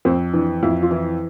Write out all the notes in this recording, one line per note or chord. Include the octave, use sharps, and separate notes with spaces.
F2 C4
E3 D4
F2 E4
F4
E3 E4